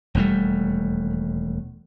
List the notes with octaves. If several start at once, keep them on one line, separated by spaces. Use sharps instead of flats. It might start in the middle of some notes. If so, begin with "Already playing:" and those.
E1 D#2 G3 A3